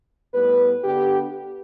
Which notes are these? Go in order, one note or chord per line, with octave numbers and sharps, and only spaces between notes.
A2 G3 B3 B4
D3 B3 D4 G4